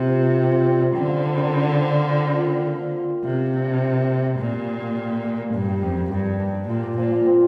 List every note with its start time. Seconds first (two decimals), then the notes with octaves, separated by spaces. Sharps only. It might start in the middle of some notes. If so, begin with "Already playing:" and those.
Already playing: C3 A#3 F4
0.09 C4
0.23 C4
0.37 F4
0.52 C4
0.66 D5
0.81 C4
0.95 D3 C4
1.09 F5
1.23 C4
1.38 A#4
1.52 A#4
1.66 C4
1.80 C4
1.95 F5
2.10 F4
2.24 F4
2.38 F4
2.52 A#3
2.67 F4
2.81 A#3
2.96 A#3
3.10 A#3
3.24 C3 F5
3.39 A#4
3.53 D4
3.67 D4
3.82 A#3
3.96 A#3
4.10 A#4
4.25 A#3
4.39 A#2 D5
4.53 G4
4.68 A#3
4.82 G4
4.97 A#3
5.11 A#3
5.25 A#3
5.40 D5
5.53 G2 D4
5.68 G4
5.82 F2 G4
5.97 G4
6.11 G2 G4
6.26 D4
6.40 D4
6.55 D5
6.69 A#2 F4
6.83 D5
6.98 A#2 F3
7.12 F4
7.26 C4